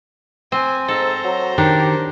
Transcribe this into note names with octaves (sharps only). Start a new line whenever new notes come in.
C4 G#5
G#2 A4 C5 A#5
F#3
D#3 D4 G4